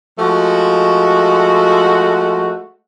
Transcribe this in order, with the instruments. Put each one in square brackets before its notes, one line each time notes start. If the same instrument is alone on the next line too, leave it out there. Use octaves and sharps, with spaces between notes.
[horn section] F3 G#3 A3 F#4